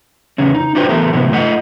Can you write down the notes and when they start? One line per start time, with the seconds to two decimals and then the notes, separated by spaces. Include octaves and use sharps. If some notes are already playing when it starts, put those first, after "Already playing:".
0.38 E2 C#3 C#4
0.55 D#4
0.75 D4 F#4 B4 C5 G5
0.89 E3 A3 B3 A#4
1.13 A2 C3 E3 B3
1.32 A3 D#5 F#5